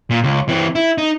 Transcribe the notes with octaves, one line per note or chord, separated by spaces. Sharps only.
A#2
C#2
E3 C4
E4
D#4